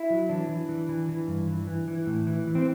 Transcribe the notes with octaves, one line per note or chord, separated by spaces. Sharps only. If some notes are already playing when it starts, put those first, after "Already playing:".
Already playing: E4
F#3
E3 D4
E3
E3
E3
E3
G2
E3
E3
E3
A2
E3
E3
C4